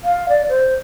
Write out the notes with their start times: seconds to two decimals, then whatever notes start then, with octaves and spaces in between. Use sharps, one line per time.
0.04 F5
0.29 D5
0.49 C5